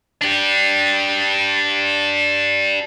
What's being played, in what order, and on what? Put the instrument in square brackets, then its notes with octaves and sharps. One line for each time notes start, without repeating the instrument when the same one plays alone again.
[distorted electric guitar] D4 G4